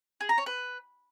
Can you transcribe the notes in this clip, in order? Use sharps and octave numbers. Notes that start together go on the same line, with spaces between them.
G#4
A#5
C#5
B4